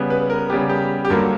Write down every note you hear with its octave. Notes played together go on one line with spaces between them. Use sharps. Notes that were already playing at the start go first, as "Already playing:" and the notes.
Already playing: C#3 G3 B3
B4
A#4
C#3 G3 B3 G4
G4
G4
G2 D3 F#3 A#3 A#4